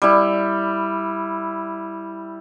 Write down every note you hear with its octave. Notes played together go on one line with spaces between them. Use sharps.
G3 E4